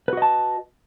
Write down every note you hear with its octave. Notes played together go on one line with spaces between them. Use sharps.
F#4 B4 D#5 A5